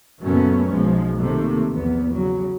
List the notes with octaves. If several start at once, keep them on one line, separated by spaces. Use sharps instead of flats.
F#2 A#2 C#3 A3 B3 C#4
B1 F3 G#3
C3 D#3 A3 A#3
A#1 E2 B3
C#3 F#3